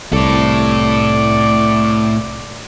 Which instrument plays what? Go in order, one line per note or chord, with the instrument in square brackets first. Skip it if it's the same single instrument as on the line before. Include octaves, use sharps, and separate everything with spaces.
[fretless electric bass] C2 [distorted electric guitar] A2 A4 [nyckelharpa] D5